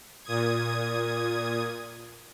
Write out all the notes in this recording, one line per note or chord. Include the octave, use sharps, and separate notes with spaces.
A#2 D#6 G#6